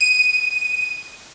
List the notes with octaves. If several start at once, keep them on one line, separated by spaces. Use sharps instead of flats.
D#7